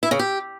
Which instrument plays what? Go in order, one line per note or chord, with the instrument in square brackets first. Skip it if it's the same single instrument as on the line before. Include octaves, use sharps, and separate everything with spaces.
[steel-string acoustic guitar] E4
C#3
G4